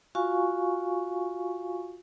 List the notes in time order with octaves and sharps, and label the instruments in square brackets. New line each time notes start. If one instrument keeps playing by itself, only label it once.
[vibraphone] F4 F#4 F5 G#5 C#6